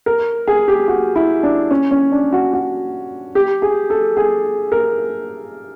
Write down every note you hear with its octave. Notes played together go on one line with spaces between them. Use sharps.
A#4
G#4
G4
F#4
E4
D4
C#4
C#4
D4
F#4
F#4
G4
G#4
A4
G#4
A#4